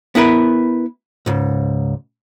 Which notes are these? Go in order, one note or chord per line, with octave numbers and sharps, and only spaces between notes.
B3 E4 A#4 B4
C#2 G#2